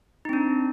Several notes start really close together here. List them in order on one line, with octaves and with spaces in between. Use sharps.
D#4 C4 D4